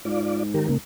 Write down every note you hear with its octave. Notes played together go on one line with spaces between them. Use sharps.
G#2 F4 D5
D#3 G4 A#4
C#3 A#3